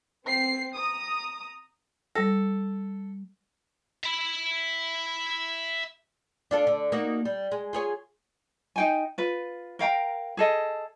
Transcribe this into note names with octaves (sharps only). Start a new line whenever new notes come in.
C4 C7
A#5 D#6
G3 A4 A#6
E5 B5
D4 F4 A4
D3
A#3 D#4 F#4
G3
G#3
F4 G#4 C#5
D#4 G5 G#5
F4 B4
A#4 F5 G5 A#5
G#4 A4 D#5